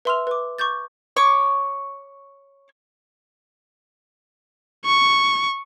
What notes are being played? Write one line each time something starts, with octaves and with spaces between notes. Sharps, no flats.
B4 E5 C6 E6 F6 F7
B4 D6
C#6 D6 G6 A6
C#5 C#6 D6
C#6